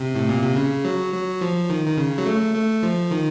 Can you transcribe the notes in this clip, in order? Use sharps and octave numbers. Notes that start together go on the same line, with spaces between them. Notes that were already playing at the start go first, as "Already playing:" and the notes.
Already playing: C3
A2
A#2
C3
C#3
F#3
F#3
F3
D#3
D#3
C#3
F#3
A3
A3
F3
D#3